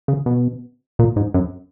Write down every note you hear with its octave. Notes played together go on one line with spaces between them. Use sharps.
C#3
B2
A#2
G#2
F#2